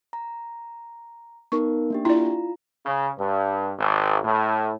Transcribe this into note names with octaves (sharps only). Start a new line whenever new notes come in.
A#5
B3 D#4 A#4 C#6
A#3 D4 G4
E4 F4 D5 A#5
C#3
G2
G#1
A2